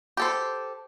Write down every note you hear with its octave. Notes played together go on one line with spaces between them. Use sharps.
G4 A4 C5